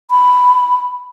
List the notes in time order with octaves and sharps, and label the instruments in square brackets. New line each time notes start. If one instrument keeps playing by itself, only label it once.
[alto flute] B5